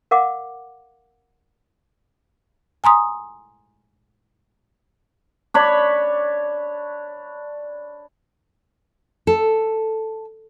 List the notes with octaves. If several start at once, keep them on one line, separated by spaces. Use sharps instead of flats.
A#4 F5 F#5 D6
G#5 A#5 C6 D#6
D4 C#5 B5
A4